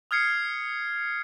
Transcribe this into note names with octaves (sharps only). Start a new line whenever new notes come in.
D#6 F6 G#6 C7 C#7